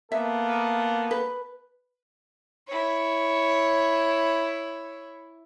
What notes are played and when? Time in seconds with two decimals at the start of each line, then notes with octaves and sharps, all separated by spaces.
0.12 A#3 B3 A4 E5
1.11 B4
2.68 E4 C#5